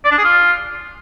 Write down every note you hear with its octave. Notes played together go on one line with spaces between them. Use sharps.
D5
D4
G#4
F4